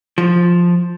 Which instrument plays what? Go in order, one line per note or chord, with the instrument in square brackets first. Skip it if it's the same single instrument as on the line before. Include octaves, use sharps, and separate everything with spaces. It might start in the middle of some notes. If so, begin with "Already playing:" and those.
[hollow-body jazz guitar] F3